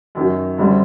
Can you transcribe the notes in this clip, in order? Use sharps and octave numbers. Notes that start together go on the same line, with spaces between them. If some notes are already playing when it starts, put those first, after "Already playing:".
F#2 D#3 F#3
F#2 D3 G3 C4